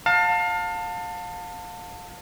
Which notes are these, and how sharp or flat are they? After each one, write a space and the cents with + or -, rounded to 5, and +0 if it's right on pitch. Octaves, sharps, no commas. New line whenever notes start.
F5 +30 A5 +30